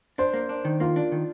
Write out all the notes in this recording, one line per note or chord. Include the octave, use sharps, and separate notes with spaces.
D4 C5
A#3
D4
D#3
A#3 F4
D4
D#3